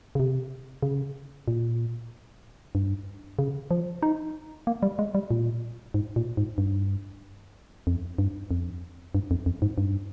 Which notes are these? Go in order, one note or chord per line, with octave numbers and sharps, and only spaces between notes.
C#3
C3
C#3
A#2
G2
C#3
F3
D#4
A#3
G3
G#3
G3
A#2
G#2
A#2
G#2
G2
F2
G2
F2
G2
F2
F2
G#2
G2